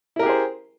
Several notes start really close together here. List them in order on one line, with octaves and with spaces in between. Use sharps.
E4 A#4 G4 G#4 C5